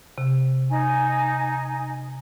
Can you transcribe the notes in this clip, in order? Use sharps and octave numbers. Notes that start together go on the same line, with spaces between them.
C3
D#4 G#5